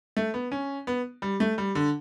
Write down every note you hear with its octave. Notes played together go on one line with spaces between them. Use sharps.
A3
B3
C#4
B3
G3
A3
G3
D3